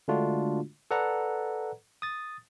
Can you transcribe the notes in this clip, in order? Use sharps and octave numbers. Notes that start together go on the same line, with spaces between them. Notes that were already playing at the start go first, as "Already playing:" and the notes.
D3 G#3 A3 D4 F4 F#4
A4 B4 D5 F#5 A#5
D#6 A6